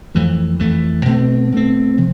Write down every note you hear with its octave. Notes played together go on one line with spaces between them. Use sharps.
F2 E3 A3
F2 E3 A3
B2 A3 C4
B2 A3 C4
C3 F3